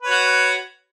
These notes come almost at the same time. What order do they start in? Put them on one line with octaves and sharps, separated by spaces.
B4 C#5 F#4